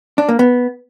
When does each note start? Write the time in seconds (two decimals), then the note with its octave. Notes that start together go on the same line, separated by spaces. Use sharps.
0.18 D4
0.29 A#3
0.39 B3